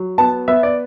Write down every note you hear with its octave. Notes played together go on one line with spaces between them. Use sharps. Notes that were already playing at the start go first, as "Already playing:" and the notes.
Already playing: F#3
B3 A5
B3 E5
D5